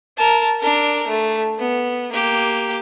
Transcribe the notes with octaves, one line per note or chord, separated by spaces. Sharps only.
A#4 A5
D4 A#4
A3
B3
A#3 G4